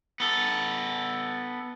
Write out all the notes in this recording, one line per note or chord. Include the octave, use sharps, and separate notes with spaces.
B3 A4